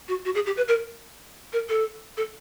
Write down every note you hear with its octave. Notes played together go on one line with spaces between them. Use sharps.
F#4
F#4
G#4
G4
B4
A#4
A#4
A4
A4